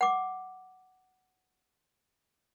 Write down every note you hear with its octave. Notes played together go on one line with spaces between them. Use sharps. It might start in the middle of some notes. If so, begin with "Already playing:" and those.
F#5 D6